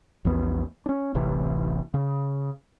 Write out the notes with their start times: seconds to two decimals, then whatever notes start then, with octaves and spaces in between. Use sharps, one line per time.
0.25 A#1 E2 B3
0.86 C#4 D4
1.14 D1 A1 C3 E3
1.94 C#3